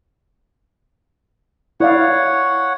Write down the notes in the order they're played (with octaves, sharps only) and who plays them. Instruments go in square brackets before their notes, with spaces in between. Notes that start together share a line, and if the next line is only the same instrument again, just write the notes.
[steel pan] E4 D5 F5 [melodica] C#5 F#5